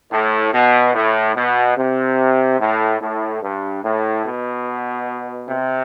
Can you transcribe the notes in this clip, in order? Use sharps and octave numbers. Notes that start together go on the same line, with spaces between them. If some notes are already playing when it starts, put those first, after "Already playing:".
A2
B2
A2
B2
C3
A2
A2
G2
A2
B2
C3